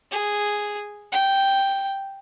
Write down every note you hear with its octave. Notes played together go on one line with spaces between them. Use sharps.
G#4
G5